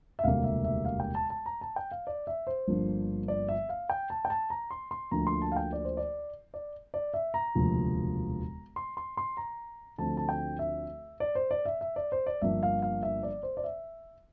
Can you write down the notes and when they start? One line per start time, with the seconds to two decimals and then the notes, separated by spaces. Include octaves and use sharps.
0.19 E5
0.24 E1 D2 C3 G3 A#3 F5
0.44 E5
0.64 E5
0.85 F5
1.00 G5
1.15 A5
1.30 A5
1.46 A#5
1.61 A5
1.76 G5
1.91 F5
2.07 D5
2.27 E5
2.47 C5
2.67 G1 G2 F3 A#3 D4
3.28 D5
3.49 E5
3.69 F5
3.90 G5
4.10 A5
4.25 G5
4.30 A5
4.50 A#5
4.71 C6
4.91 C6
5.11 D2 D3 F3 A#3 A#5
5.27 C6
5.42 A5
5.52 F5
5.56 G5
5.73 D5
5.85 C5
5.97 D5
6.54 D5
6.94 D5
7.14 E5
7.34 A#5
7.55 E1 D2 C3 F3 A#3
8.76 C6
8.97 C6
9.17 C6
9.37 A#5
9.98 D2 D3 F3 A3 C4 A5
10.17 A5
10.29 G5
10.59 E5
11.20 D5
11.35 C5
11.51 D5
11.65 E5
11.81 E5
11.96 D5
12.12 C5
12.27 D5
12.42 G1 G2 F3 A#3 D4 E5
12.63 F5
12.82 F5
13.03 E5
13.23 D5
13.43 C5
13.57 D5
13.64 E5